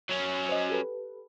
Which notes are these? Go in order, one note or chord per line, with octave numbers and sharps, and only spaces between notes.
F#3 C#4
C5 D#5
G4 A4 B4